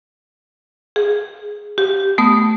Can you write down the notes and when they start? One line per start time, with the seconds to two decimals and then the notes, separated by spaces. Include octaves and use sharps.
0.96 G#4
1.78 G4
2.18 A3 B3 D#6